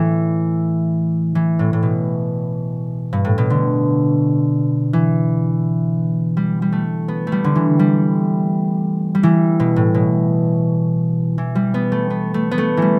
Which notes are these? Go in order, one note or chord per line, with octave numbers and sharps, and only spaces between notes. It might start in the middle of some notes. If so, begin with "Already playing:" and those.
Already playing: A2 E3
E3
A2
A2
B2
G2
A2
B2
D3
E3
G3
G3
A3
B3
A3
G3
D3
E3
G3
G3
E3
B2
A2
B2
E3
G3
B3
A3
B3
A3
B3
A3
E3 G3